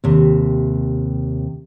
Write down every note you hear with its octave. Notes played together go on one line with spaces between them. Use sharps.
D#2 C3